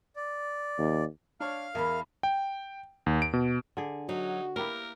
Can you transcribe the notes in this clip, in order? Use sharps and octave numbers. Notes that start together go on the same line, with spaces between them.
D5
D#2
D4 C#5 F5 F6
E2 E3 E4 A#4
G5
D#2
D7
B2
D3 G#4
F#3 D#4 F#4
A#3 E4 G4 A#4 B4